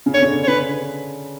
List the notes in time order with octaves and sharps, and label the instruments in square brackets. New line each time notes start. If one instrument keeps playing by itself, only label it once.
[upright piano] C#3
[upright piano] D3 [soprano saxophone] C#5
[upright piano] C#3
D3
[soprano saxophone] C#5
[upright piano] C#3 [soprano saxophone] B4